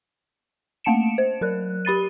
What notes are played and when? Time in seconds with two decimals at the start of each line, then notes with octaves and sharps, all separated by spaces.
0.84 A3 A#3 A5 C#7 D7 E7
1.18 C5
1.41 F#3 A#4 F#6
1.85 G4 B5 A6 D#7